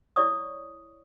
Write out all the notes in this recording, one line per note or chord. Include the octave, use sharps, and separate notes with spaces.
E4 C#5 D5 C#6 D#6